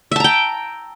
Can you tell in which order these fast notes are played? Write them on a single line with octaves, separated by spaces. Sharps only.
E5 A5 A#5 G5